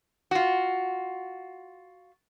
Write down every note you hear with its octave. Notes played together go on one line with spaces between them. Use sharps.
F4 F#4